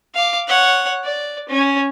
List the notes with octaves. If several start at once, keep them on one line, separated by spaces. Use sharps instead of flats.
F5 D6
C#5 F#5
D5
C#4